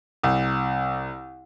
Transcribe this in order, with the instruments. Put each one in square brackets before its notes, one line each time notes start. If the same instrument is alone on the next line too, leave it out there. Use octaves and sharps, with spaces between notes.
[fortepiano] C2